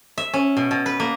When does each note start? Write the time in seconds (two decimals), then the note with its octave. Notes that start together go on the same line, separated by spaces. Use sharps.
0.18 E5
0.34 C#4
0.57 B2
0.71 B2
0.86 B4
1.00 A#3